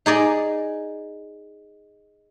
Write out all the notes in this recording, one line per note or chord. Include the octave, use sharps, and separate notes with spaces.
D#4 G#4 D5 D#5